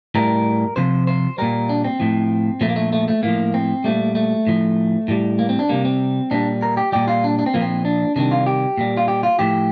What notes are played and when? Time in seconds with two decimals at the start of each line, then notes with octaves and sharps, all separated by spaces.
0.15 A2 G3 A#4
0.76 C3 F3 C5
1.07 C5
1.38 A#2 G3 A#4
1.69 D4
1.84 C4
2.00 A2 F3
2.61 A#2 F3 A3
2.69 A#3
2.76 A3
2.93 A3
3.08 A3
3.23 A2 F3 A#3
3.54 C4
3.84 A#2 G3 A3
4.15 A3
4.47 A2 F3
5.08 A2 G3
5.39 A#3
5.49 C4
5.59 D4
5.69 C3 G3 A#3
5.85 C4
6.31 A#2 G3 D4
6.62 A#4
6.77 G4
6.92 A#2 G3 G4
7.08 F4
7.24 D4
7.39 D4
7.46 C4
7.54 A#2 F3 A#3
7.61 C4
7.85 D4
8.16 C3 D#3 G3 D4
8.31 F4
8.46 G4
8.78 A#2 G3
8.97 F4
9.08 G4
9.23 F4
9.39 A2 F3 G4